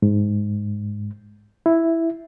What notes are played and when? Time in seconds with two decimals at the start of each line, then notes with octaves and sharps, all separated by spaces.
0.02 G#2
1.66 E4